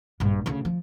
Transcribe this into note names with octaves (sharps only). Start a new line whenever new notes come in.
A#1 G2
D2 C#3
F3